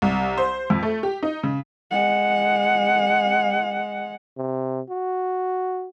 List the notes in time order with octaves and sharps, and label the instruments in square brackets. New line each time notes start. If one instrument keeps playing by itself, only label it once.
[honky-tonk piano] C2
C5
F2
A3
G4
D#4
C#3
[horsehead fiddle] G#3 F#5
[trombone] C3
F#4